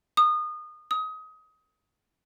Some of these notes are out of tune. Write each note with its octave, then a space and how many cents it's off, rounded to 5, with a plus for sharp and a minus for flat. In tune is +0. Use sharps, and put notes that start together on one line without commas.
D#6 -25
D#6 +25